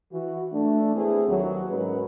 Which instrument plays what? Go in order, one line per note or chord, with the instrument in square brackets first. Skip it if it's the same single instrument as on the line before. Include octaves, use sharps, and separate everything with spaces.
[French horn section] E3 F#4
A3 D4
A3 B3 C4 E4 G#4
D#2 F#3
G#2 F#3 G#3 C#4 A#4 B4